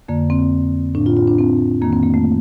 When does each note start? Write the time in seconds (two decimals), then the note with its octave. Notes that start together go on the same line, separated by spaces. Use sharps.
0.08 F2 D3 A#3
0.30 C4
0.95 A2 D4
1.06 F4
1.17 F4
1.28 D4
1.38 C4
1.81 F2 D#3 A#3
1.93 C4
2.03 A#3
2.14 A3